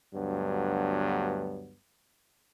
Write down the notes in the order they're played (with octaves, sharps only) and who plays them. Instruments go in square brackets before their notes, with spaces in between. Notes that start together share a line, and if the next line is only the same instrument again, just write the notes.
[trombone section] D2 G2 F#3 B3